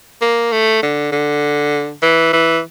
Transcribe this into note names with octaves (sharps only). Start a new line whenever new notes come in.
A#3
A3
D3
D3
E3
E3